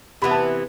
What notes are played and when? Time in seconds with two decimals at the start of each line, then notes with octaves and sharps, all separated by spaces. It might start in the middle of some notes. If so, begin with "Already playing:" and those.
0.22 C3 E3 B3 B5
0.31 A5